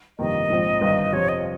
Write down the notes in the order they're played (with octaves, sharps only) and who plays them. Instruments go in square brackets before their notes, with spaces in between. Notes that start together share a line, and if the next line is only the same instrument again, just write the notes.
[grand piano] G1 F2 C3 D#3 A#3 [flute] D#5
[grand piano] A#1 G#2 F3 C4
G1 G2 D#3
[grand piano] F2 C3 F3 C4 F4 [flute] C#5
[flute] D#5